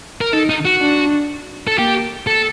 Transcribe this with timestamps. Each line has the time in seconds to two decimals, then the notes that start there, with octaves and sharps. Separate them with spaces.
0.21 A#4
0.33 D#4 A4
0.49 D#4
0.65 F#4
0.81 D4
1.67 A4
1.78 A#3 G4
2.27 A4